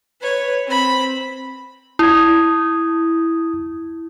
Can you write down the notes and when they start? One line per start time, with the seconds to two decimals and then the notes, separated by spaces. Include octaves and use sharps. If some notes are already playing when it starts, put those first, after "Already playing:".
0.21 B4 C#5
0.66 C4 B5
1.99 E4 D#6 G#6